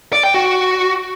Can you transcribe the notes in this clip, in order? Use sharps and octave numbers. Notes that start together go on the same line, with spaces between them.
D5
G5
F#4